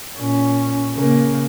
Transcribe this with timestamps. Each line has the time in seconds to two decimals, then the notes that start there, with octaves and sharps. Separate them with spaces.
0.18 A#2 C#4
0.95 C#3 A#3